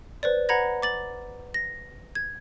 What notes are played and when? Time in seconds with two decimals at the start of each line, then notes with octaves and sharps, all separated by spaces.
0.23 B4 C5 D5
0.49 B4 F#5 A#5 B5 G#6 A#6
0.82 D6 A6 F#7
1.54 A#6
2.15 G#6